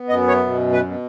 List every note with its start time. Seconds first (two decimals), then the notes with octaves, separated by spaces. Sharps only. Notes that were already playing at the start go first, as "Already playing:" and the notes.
Already playing: B3
0.09 F#2 D#5
0.28 C#5
0.46 B2
0.72 B4
0.86 B2